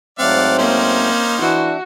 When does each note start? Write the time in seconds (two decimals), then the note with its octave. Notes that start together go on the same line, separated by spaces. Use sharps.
0.19 G#2 F#3 A3 C4 D5 F5 F#5
0.58 A#3 C#4 D#4 C5
1.42 E3 D4 F#4 E5